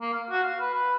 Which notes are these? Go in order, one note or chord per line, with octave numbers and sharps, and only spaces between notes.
A#3
F5
F#4
F5
B4
B4